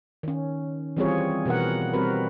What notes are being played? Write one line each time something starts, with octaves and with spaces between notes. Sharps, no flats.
D#3 C#4
E3 G3 C4 F4 G#4 C#5
B2 E3 B3 A#4 F#5
G3 C4 F#4 A#4 B4